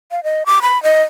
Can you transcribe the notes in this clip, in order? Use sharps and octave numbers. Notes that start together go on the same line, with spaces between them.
F5
D#5
D6
B5
D#5